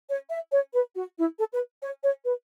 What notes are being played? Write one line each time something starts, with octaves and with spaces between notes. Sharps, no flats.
C#5
E5
C#5
B4
F#4
E4
A4
B4
C#5
C#5
B4